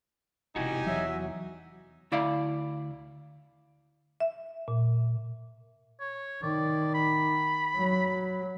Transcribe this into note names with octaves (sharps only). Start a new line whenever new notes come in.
E1 C3 D#4 E4 F#4 G4 G#5
E2 F#3 E5
D2 E4 D5 F5
E5
A#2
C#5
D#3 D5
B5
F#3